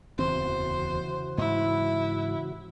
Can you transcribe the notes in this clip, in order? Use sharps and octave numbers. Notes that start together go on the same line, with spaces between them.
D1 E2 C#3 E3 C4 F#4 C5
G#2 E4